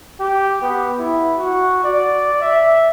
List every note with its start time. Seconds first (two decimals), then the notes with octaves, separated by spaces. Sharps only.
0.20 G4
0.62 B3
0.99 E4
1.39 F#4
1.84 D5
2.41 E5